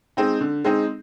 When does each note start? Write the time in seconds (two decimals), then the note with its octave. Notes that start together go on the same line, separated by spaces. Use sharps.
0.17 G#3 C4 D#4
0.41 D3
0.64 G#3 C4 D#4